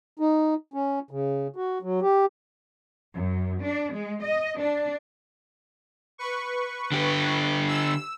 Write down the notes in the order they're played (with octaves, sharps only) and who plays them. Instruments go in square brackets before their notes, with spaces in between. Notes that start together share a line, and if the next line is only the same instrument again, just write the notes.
[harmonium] D#4
C#4
C#3
F#4
F#3
G4
[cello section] F#2
D4
G#3
D#5
D4
[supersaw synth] B4 C#6
[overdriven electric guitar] D3 G4
[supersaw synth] E6